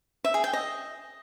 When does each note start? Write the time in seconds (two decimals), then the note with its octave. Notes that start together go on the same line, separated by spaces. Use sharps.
0.24 E5
0.34 G#4
0.44 G5
0.53 D#5